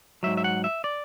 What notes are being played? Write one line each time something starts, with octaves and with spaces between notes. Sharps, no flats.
G#2 F#3 E5
E5
F#5
E5
D5